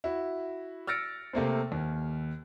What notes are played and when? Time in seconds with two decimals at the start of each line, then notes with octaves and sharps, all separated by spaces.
0.04 E4 F#4
0.87 E6 F6 A6 A#6 C#7 D7
1.33 C3 A3 A#3 C4
1.72 D#2